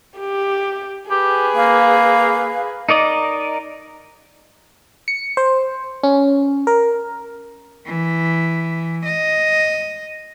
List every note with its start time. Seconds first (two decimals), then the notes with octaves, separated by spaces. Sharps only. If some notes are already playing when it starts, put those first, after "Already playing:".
0.19 G4
1.11 G4 G#4 B4
1.56 A#3 F5
2.89 D#4 A#4 D5 D#5
5.08 C#7
5.37 C5
6.03 C#4
6.67 A#4
7.86 E3
9.05 D#5